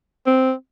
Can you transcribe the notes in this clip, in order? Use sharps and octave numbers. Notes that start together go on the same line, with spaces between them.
C4